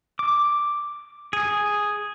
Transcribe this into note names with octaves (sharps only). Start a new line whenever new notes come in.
D6
G#4